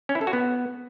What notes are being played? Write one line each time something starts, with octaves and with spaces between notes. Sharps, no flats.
C#4
E4
A4
F#4
B3